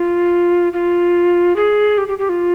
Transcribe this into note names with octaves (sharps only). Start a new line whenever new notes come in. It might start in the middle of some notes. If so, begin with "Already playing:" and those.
Already playing: F4
F4
G#4
G4
G4
G4
F4